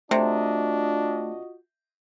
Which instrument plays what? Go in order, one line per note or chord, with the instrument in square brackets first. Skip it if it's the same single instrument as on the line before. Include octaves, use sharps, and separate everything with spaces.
[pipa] C3 [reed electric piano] A3 [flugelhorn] D4 [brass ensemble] F4 F#4 D#5